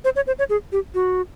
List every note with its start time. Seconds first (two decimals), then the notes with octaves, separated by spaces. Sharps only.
0.05 C5
0.16 C#5
0.27 C5
0.39 C#5
0.50 G#4
0.72 G4
0.94 F#4